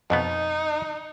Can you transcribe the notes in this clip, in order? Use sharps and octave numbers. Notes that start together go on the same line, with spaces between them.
F2 B2 B3 D#4